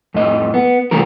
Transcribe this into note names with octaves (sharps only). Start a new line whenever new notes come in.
F2 A2 D#5
B3
C2 E3 F3 A3 A#4